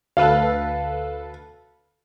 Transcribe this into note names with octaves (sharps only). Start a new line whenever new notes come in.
D2 A4 B4 F5